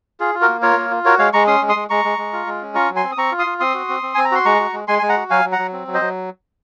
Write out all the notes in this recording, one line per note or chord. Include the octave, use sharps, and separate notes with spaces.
F4 G#4
F4
F#4 A#4
A#3
F4 A#4 C#5
A#3
F4
F#4 A#4 C#5
G#3 C#5 F5
G#3 A#5 C#6
C#4 C6 D#6
G#3
C6 D#6
G#3
G#3 A#5 C#6
G#3
G#3
F4
G#3
C#4
F4 A#5 C#6
F#3
G#5 C6
C4
D#6
C4 A#5 C#6
F4
C6 D#6
F4
C4 C6 D#6
F#4
C4
C4
C4 G#5
A#5
F#4 C6
G#3 A#5 C#6
F#4
G#3
G#3 G#5 C6
G#3 G#5
F#5 A#5
F#4
F#3 F5 G#5
F#3
F#5 A#5
F#3
C4
F#3
C5 D#5
F#3